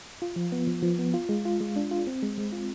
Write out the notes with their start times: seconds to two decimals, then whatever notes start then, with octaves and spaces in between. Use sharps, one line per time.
0.22 F4
0.36 F3
0.52 B3
0.67 F3
0.82 F3
0.99 B3
1.14 F4
1.29 G#3
1.45 F4
1.61 G#3
1.76 D4
1.91 F4
2.07 C4
2.23 G#3
2.38 G#3
2.52 F4